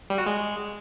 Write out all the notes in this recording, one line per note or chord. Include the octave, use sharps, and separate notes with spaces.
G3
F#4
G#3